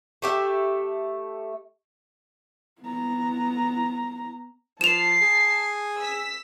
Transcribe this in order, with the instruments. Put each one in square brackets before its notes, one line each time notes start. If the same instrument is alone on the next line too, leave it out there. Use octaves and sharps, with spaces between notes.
[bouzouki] A3 G4 E5
[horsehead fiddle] B3 A#5
[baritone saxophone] F3 [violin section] A5 C7 [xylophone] E7 F7
[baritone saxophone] G#4
[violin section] E6 B6